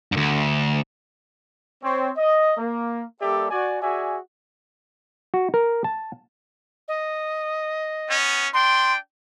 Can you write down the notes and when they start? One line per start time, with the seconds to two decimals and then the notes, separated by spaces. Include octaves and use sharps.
0.12 D2 G2
1.83 C4 C#5
2.17 D#5
2.57 A#3
3.21 G3 A#3 G4 A4 D5 E5
3.50 F#4 D5 G#5
3.82 F#4 G#4 D5 E5 G#5
5.34 F#4
5.54 A#4
5.84 A5
6.88 D#5
8.09 B3 C#4
8.53 D4 G5 C6